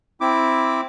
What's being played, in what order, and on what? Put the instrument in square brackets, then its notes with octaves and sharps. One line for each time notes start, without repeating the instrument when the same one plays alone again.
[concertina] C4 E4 D6